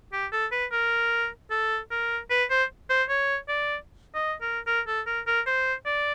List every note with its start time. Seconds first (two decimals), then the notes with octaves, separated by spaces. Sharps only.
0.12 G4
0.32 A4
0.51 B4
0.72 A#4
1.51 A4
1.91 A#4
2.30 B4
2.50 C5
2.89 C5
3.09 C#5
3.48 D5
4.15 D#5
4.41 A#4
4.67 A#4
4.87 A4
5.07 A#4
5.27 A#4
5.46 C5
5.86 D5